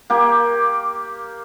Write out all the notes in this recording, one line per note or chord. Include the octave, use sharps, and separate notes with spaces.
A#3 G4